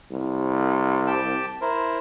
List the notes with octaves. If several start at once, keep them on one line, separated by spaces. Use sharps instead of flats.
C2
G4 G5 A5
E4 A#4 C5